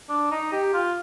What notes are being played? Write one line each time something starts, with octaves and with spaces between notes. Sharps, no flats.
D4
D#4
G4
F4